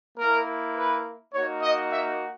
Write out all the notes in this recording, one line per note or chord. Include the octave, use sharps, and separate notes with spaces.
A#3 E4 A#4
B4
A#3 D#4 F#4 C#5
D#5
E5